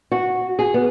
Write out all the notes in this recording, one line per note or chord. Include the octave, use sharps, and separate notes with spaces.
F#4
G#4
B3